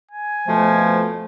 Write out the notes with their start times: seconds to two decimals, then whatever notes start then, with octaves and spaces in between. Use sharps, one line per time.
0.11 G#5
0.48 F2 B2 F3 A3